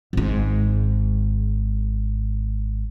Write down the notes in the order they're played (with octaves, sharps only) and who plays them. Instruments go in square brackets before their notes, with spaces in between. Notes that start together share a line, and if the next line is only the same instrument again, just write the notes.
[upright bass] G#1 G#2